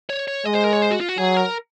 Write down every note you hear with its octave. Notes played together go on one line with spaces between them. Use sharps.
C#5
C#5
G#3 D#5
C5
A#4
C#5
C5
F#4
F4
F#4
F#3 G#4
A#4